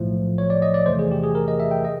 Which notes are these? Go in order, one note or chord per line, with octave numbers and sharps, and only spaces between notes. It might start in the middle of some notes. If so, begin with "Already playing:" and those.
Already playing: B1 A2 F3 A3
C#5
D5
D#5
D5
E2 C3 E3 A3 C5
G#4
G4
G#4
A#4
D#5
E5
G5
D#5